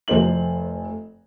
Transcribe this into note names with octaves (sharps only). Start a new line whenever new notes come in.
F1 C5 F#7